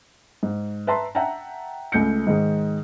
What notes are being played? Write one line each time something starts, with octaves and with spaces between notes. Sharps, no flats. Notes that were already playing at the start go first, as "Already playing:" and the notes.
G#2
B4 E5 A5 A#5 C6
E5 F#5 G5 A5 A#5
C#2 A3 G6 C#7
G#2 D#3 G#3